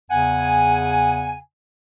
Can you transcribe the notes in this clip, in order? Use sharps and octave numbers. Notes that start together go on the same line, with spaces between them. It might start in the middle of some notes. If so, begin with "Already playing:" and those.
E2 C#3 F#5 G#5